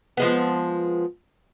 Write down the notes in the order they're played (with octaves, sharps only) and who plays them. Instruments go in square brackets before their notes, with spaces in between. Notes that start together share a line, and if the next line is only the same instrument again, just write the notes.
[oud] F3 G#3 B3